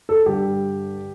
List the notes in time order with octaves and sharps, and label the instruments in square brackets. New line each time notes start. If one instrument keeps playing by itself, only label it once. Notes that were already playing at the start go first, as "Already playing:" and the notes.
[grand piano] A4
G2 D3 G4